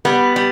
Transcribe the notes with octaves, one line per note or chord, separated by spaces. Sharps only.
G3 B3
G3